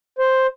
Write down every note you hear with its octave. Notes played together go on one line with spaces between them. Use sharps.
C5